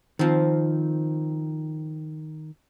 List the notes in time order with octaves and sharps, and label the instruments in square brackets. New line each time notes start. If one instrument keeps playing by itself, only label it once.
[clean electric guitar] D#3 [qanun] F3 C4